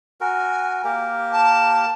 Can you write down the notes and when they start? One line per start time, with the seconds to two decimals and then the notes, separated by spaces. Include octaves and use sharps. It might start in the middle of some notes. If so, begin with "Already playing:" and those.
0.21 F#4 A#4 G#5
0.84 A#3 G4 A#4
1.31 A5